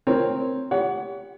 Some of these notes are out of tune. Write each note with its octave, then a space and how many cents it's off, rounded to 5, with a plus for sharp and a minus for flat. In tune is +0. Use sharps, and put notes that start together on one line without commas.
C4 +0 A#4 +0 C#5 -5
G4 +10 C#5 +35 F#5 +0